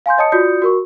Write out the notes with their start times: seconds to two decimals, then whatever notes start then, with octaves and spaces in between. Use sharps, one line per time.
0.06 F5 G#5 C6 G6
0.18 C#5 D#5 A5 D#6 C#7
0.32 F4 F#4 D5 D#6 G6 C#7
0.62 F#4 A#4 C#6